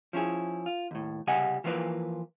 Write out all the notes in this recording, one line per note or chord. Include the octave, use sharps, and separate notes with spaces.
F3 C#4 E4 G#4
F4
D#2 A2
C2 C#3 G3 D#5 F#5 G#5
E3 F3 A#3 B3 B4 D5